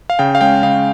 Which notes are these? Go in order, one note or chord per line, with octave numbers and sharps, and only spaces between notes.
F5
C#3 G5
F5
G#3 C#4 G5
C#3 F5